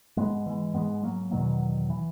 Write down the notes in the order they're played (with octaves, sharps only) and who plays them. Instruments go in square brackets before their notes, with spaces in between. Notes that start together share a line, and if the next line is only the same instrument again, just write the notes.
[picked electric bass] G#2 G#3 B3
E3 G#3
G#2 G#3 B3
F#3 A#3
E2 B2 D#3 F#3
E3